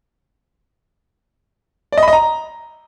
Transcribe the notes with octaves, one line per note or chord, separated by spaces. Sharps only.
D5
D#5
B5
D#5
A#5